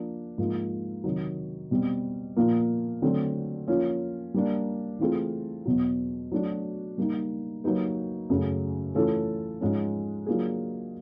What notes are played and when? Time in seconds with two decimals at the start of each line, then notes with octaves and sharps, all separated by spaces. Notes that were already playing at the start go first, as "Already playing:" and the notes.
Already playing: F3 A#3 D4
0.38 G#2 F3 A#3
1.04 C3 D#3 F#3
1.71 B2 G3 C4
2.36 A#2 F3 A#3
3.02 D3 F#3 A3 C4
3.68 F3 A#3 C#4 F4
4.34 G3 A#3 D4
4.99 E3 A3 C4 F4 G#4
5.65 E2 B2 F#3
6.32 F#3 A3 D4 F#4
6.98 G3 A#3 D#4
7.64 F#3 A#3 D#4 G4 B4
8.30 F#2 C#3 F#3 A3
8.95 E3 A3 C#4 F4 A4
9.61 G#2 F3 G#3 C#4
10.26 F#3 A#3 D4 F4 G#4